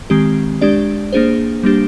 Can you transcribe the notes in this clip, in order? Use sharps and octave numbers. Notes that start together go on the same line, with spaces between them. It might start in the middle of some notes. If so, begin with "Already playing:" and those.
D#3 G#3 C4 G4
G#3 D4 G4 D5
A#3 D4 G#4 C5
G3 A#3 D4 G4